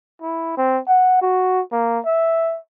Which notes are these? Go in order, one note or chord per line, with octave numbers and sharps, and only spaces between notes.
E4
C4
F#5
F#4
A#3
E5